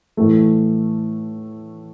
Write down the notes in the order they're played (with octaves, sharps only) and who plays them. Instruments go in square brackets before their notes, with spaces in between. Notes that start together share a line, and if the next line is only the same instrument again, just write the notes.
[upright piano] A2 E3 A3